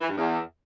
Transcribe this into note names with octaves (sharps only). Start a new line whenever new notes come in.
E3
G2
E2